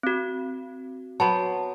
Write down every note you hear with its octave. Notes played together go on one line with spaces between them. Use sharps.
C4 F#4
F#3 B3 C5 A5